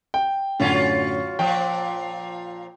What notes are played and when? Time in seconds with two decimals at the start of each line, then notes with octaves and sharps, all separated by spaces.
0.14 G5
0.60 F#2 A2 D3 F#3 C#4 F4
1.39 A#2 F3 G5